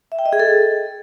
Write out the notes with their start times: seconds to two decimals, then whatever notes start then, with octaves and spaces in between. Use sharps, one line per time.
0.12 E5
0.19 G5
0.26 D#5
0.33 G#4
0.39 A4